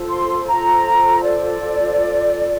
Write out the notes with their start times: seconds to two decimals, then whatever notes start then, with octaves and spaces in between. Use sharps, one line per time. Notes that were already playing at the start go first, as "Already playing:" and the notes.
Already playing: F4 A4 C5
0.08 C6
0.47 A#5
1.23 D5